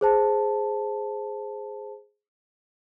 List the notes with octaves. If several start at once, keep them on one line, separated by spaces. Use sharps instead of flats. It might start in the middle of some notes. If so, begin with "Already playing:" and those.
G#4 C5 A5